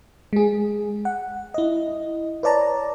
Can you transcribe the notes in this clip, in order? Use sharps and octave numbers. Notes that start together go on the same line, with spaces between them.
G#3 G#4
F#5
E4 D#5
B4 C#5 D5 A5 A#5